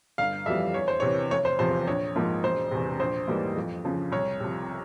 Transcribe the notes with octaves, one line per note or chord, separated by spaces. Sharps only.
G1 F5
F2 E3 G3 E5
E2 C#5
C5
C3 E3 C#5
F1 C#5
C5
E2 C3 F3 C5
A#1 C#5
G#2 F3 A#3
E1 C5
E2 C3
A#1 C5
G#2 E3 G3 A#3
F2
C#3 F3
C2 C#5
C3 F3